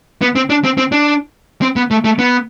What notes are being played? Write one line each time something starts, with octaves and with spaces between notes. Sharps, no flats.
B3
C4
D4
C4
C4
D4
C4
B3
A3
A3
B3